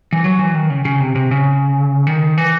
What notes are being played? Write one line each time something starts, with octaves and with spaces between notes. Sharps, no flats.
E3
F#3
E3
D#3
C#3
C#3
C3
C3
C#3
D#3
E3